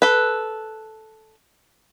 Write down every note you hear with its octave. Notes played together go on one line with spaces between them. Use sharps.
A4 B4